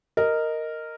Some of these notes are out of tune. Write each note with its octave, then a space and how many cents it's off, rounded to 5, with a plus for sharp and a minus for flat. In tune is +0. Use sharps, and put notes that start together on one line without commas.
A#4 -10 D#5 +0